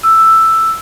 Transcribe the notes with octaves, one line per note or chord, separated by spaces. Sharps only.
E6